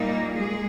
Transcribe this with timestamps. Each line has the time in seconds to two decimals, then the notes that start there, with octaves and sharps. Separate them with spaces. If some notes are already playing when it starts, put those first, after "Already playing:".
Already playing: A#2 G3 A#3 D#4
0.37 G#3 G#4